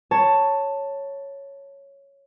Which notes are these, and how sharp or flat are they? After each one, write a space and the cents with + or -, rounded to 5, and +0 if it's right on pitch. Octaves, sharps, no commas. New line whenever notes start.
C#5 +0 A5 +10